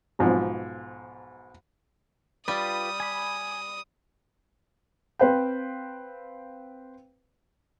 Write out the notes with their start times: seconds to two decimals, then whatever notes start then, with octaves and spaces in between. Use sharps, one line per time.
0.19 B1 G#2 F3
2.48 G3 F4 G4 B4 D#6
3.00 G#5 B5
5.19 C4 B4 C5 F5 G5